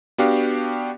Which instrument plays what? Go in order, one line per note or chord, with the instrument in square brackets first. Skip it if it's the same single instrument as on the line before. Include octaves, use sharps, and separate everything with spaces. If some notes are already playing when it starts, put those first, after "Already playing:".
[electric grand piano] B3 D4 F#4 G4 F5